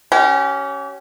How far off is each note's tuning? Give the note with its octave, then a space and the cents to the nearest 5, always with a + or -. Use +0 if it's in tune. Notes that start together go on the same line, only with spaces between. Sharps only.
C#4 +0 G4 -40